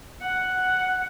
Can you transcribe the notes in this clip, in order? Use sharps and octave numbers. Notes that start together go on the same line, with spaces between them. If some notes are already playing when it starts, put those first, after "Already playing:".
F#5